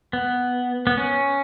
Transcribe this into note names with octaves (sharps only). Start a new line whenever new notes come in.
B3
B3
C#4